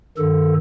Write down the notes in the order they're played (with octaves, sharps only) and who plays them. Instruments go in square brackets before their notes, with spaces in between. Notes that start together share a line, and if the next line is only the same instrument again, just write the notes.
[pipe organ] G2 D#3 A4